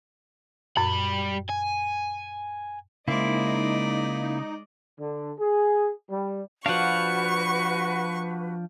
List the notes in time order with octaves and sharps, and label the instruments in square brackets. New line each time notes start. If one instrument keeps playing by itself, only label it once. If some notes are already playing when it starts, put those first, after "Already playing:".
[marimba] F#2 A#2 [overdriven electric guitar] G3 B5
[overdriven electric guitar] G#5
[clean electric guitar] C#3 C5 [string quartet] G#3 D5 D#5 [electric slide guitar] A#3 E4 [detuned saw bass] D#4
[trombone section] D3
G#4
G3
[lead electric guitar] F3 D4 [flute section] F#4 B4 [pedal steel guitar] F5 F#5 [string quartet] C#6